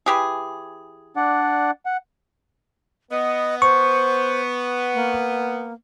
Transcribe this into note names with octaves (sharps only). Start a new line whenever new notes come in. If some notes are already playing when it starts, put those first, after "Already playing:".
E3 G4 G#4
D4 D5 F#5
F#5
B3 D#5
C5 C#6
A#3